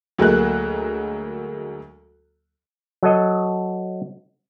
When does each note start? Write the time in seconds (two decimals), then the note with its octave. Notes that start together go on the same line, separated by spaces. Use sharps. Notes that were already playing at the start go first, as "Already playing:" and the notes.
0.18 D2 F#3 G#3 A#3 F#6
3.03 F#3 A4 D#5